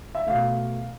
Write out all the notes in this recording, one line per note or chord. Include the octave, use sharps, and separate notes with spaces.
E5
B2 A3 F5